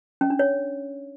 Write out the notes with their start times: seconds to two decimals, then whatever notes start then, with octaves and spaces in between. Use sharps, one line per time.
0.21 C#4
0.30 D4
0.39 C#5